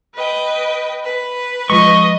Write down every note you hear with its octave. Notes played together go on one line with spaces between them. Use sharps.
B4 D#5 G5
B4
F3 G#3 D#5 C#6